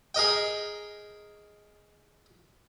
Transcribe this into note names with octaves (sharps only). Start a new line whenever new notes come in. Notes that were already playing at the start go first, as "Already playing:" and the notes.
G#4 A#4 D#5 G5